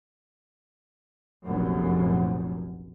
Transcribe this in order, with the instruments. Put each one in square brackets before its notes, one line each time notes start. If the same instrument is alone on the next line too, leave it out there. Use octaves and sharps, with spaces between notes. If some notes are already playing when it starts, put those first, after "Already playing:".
[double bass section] F1 A#1 F#2